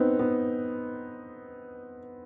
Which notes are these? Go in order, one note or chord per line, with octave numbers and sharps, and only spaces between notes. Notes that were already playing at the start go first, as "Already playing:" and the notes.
Already playing: B3 C4 D#4
B3